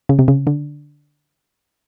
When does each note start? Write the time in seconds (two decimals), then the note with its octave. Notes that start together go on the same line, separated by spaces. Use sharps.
0.09 C#3
0.19 C3
0.28 C#3
0.47 D3